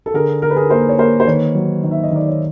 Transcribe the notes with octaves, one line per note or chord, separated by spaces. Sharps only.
A4
D3 G#4 A#4
D3 A#4
B4
G#4 A#4
A#3 A#4 C5
C#5
A#3 A#4 C5
C5
D#3 B4 C#5
F#3
D#3
E5
D#5
D#3 D5
C#5